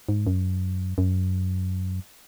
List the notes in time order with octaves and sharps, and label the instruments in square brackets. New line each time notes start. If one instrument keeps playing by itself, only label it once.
[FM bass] G#2
F#2
F#2